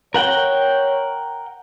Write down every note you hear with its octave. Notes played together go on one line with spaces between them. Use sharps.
A#4 C#5 F#5 G5